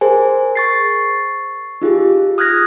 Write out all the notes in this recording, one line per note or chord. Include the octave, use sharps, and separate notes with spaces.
G#4 A#4 C5 G#5
C#6 A6 C7
D#4 F4 G4 G#4
D#6 F6 F#6 G#6 A#6